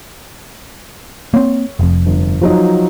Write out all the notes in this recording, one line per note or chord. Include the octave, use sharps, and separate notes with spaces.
A#3 C4 C#5
F1 F2
G1
F3 F#3 D#4